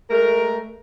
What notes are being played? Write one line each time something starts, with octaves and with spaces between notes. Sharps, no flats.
G#3 A3 A#4